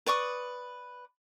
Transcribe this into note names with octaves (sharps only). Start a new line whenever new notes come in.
B4 D5 C#6 D#6